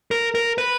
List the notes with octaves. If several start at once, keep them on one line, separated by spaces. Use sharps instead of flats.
A#4
A#4
B4